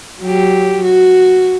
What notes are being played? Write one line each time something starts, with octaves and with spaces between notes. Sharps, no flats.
F#3 G4
F#4